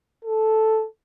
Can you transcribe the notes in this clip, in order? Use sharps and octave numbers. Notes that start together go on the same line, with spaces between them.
A4